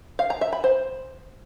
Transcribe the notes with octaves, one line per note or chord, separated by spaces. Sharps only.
F5
A#5
E5
B5
C5